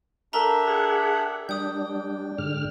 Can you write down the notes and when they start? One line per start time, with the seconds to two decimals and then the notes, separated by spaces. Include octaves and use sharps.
0.33 D4 G4 A4 A#4 E5 A#5
0.68 G#4 F#5
1.49 G3 D4 G5 D#6 G6
2.38 G#2 D3 F6